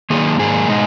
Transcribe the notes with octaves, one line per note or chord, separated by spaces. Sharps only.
D#3 F#3 A#3 D#4 G#4
G#2 D#3 A#3 G#4
B2 G#3 D#4